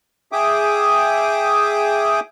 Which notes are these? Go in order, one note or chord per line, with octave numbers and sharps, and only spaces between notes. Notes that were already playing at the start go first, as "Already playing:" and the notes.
G#4 E5 G5 D6 D#6